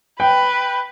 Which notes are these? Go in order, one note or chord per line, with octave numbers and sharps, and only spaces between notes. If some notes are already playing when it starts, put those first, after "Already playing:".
B4 G5